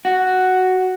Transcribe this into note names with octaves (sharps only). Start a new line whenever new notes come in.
F#4